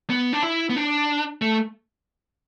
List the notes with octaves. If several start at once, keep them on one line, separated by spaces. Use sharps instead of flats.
B3
D4
E4
B3
D4
A3